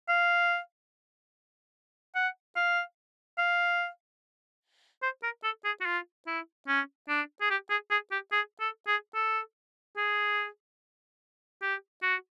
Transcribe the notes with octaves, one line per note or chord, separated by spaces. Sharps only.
F5
F#5
F5
F5
C5
A#4
A4
G#4
F#4
F4
E4
C#4
D4
G#4
G4
G#4
G#4
G4
G#4
A4
G#4
A4
G#4
G4
F#4